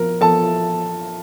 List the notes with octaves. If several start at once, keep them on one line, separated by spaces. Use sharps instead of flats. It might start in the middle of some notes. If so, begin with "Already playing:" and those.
Already playing: F3 A#4
F3 A4 A5